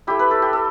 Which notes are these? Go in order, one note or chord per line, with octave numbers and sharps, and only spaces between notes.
A3 E4 G4
B4
A4
G4
A4